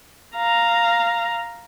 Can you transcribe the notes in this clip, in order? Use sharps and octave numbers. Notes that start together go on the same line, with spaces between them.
F5 A#5